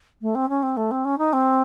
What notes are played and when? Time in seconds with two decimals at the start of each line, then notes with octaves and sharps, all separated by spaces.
0.21 A3
0.35 C4
0.49 C#4
0.63 C4
0.77 A3
0.91 C4
1.05 C#4
1.18 D#4
1.33 C4